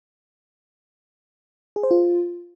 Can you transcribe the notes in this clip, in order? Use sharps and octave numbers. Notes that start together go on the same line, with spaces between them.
G#4
C5
F4